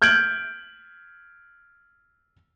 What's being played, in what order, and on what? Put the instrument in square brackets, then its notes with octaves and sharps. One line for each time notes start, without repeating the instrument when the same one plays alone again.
[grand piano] F6 G6 G#6 D7 F#7